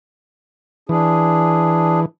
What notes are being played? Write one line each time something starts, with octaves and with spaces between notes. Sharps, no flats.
E3 D4 G#4